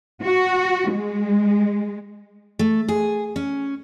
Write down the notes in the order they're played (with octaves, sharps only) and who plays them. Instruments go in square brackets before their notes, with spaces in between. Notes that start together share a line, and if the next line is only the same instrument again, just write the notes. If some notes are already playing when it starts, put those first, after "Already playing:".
[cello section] F#4
G#3
[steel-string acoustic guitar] A3
G#4
C#4